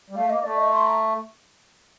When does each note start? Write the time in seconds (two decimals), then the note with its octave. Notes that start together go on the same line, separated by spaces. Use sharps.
0.10 G3
0.16 A3 F5
0.29 A#3 D#5
0.43 A3 D5
0.57 D#5
0.72 C6
0.86 A#5